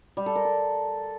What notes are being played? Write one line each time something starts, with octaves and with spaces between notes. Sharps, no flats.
G3
A4
A#4
A4